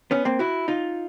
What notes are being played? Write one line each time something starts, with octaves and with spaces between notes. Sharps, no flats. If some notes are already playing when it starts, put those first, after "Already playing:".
B3 C#4
A#3 C4
E4 F#4
D#4 F4